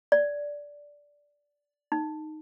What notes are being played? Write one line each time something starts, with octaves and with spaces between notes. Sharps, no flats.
D5
D#4